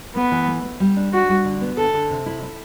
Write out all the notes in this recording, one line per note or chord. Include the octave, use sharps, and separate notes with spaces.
A3 B3
E3
A3
A3
G3
D4
D4 F#4
G3
D3
B3
D3 A4
D3
C3
E4
E4